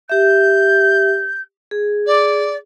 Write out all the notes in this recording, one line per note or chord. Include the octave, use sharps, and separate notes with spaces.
G4 E5 G6
G#4
D5